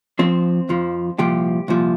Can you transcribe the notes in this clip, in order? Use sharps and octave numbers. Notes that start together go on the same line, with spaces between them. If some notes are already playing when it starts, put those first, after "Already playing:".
F2 F3 C4
F2 F3
C2 A#2 F3 G4
C2 A#2 F3